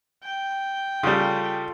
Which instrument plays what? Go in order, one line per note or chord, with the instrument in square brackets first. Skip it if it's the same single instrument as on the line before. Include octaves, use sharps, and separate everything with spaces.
[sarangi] G5
[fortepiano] C#3 G3 [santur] F4 A4